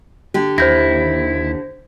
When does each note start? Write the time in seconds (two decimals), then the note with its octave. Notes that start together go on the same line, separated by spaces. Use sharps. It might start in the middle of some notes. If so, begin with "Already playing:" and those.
0.34 D3 G4
0.58 D#2 E4 C5 G6 A#6